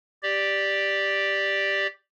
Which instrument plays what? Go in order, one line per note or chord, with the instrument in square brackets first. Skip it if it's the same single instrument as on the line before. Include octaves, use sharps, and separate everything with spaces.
[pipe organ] G4 D5